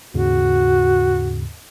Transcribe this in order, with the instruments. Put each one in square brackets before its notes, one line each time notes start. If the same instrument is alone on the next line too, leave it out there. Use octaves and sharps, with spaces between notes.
[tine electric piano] D#2 G#2 C#3 [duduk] F#4